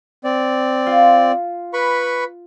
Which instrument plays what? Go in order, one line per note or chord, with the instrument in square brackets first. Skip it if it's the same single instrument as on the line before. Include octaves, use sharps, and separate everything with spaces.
[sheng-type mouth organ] C4 D5
[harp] F4
[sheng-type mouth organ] B4 B5 C#6